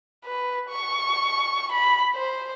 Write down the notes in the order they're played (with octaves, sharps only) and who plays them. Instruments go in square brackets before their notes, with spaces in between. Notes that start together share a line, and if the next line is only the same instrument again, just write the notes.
[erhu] B4
C#6
B5
C5